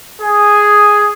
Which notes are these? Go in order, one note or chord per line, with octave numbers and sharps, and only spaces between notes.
G#4